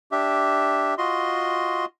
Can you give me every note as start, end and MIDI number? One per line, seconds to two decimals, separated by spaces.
0.12 0.94 62
0.12 0.94 67
0.12 0.94 76
0.98 1.85 65
0.98 1.85 66
0.98 1.85 75
0.98 1.85 84